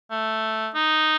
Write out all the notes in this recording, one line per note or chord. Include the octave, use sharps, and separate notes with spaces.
A3
D#4